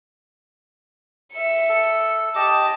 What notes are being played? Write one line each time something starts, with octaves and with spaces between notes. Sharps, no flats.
E5 C#7
A4
G4 D#5 A5 D6